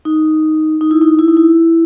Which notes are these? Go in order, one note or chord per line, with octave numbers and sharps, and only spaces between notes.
D#4
D#4
E4
D#4
E4
D#4
E4